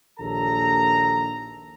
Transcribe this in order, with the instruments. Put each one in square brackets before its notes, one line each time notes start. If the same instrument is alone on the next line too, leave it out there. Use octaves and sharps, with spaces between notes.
[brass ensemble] A#1 D#2 A4 A#5